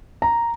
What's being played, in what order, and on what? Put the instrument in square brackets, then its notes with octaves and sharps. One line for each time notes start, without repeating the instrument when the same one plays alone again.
[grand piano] A#5